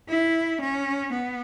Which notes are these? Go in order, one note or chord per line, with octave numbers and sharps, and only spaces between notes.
E4
C#4
B3